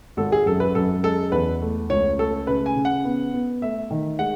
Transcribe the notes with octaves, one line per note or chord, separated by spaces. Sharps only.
G#1 A4
G#4
F#2 A4
B4
F#2 A4
G#3 A4
E2 B4
A3
C#2 C#5
A3 A4
C#3 B4
G#5
C#3
F#5
B3
B3
A3 E5
D#3
G#3 F#5